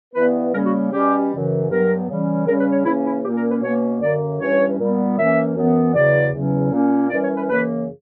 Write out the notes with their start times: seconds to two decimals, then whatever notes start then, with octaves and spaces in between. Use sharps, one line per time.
0.14 G2 E3 B3 B4
0.53 C#3 G3 A#3 C#4 A#4
0.66 F#4
0.92 B2 G3 C#4 G4
1.30 F#2 C#3 E3
1.69 G2 F#3 B3 A#4
2.08 C#3 E3 G3 C#4
2.46 C#3 G3 C#4 A#4
2.59 B4
2.72 C#5
2.85 C#3 E3 A#3 C#4 E4
3.04 E4
3.23 A#2 A#3 C#4 G4
3.36 A#4
3.49 B4
3.62 B2 A#3 C#4 C#5
4.01 F#2 D3 A#3 D5
4.39 G2 E3 G3 C#4 C#5
4.78 A#2 G3 B3
5.17 F#2 E3 A#3 C#4 E5
5.55 F#2 E3 B3
5.94 E2 C#3 F#3 D5
6.33 E2 C#3 F#3 C#4
6.72 A#2 A#3 C#4
7.10 F#2 E3 G3 C#4 D5
7.23 C#5
7.36 B4
7.49 F#2 C#3 E3 A#3 B4